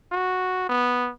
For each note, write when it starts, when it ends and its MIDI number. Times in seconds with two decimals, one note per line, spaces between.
0.12 0.69 66
0.69 1.10 59